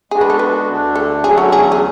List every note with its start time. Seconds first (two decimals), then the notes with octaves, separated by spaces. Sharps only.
0.11 G#3 B3 D4 F#4 G#4
0.21 B4
0.30 A4
0.39 B4
0.68 D2 D3 A3 D4
0.95 A4
1.24 E2 D3 F#3 A3 C#4 G#4
1.38 F#4
1.52 G#4
1.72 G#4